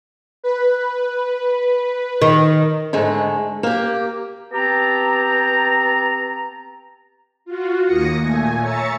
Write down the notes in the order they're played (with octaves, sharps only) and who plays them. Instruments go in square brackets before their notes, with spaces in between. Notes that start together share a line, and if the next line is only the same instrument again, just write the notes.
[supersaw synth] B4
[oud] D#3
[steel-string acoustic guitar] G#2 D3 G#3 A3
A#3 G4
[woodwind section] B3 C4 G4 A5 A#5
[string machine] F4 F#4
D#2 A#3 D#6 A#6 C#7
A#2 A3 G#5
C#5 E5 A#5 A6 C#7